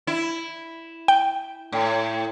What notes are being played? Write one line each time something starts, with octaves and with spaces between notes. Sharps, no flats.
E4
G5
A2